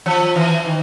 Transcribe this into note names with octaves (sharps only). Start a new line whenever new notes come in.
F3
E3
D#3